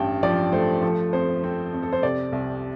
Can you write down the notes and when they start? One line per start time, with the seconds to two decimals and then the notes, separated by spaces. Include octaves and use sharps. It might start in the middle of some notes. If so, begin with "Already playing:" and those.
Already playing: A1 G2 G5 A5
0.23 F3 D5
0.52 A3 C5
0.83 F3 A4
1.13 F2 C5
1.43 C4
1.73 F2
1.83 A4
1.93 C5
2.03 C3 D5
2.32 C2